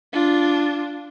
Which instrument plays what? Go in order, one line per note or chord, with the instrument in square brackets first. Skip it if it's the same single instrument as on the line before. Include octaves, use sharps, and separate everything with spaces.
[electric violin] D4 F4